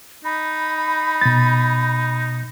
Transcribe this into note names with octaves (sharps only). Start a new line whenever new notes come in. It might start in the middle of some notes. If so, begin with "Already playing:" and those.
D#4 B5
B2 A6